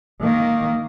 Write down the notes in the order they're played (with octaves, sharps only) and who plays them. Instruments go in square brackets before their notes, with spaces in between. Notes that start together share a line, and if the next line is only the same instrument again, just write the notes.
[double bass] D#3 A#3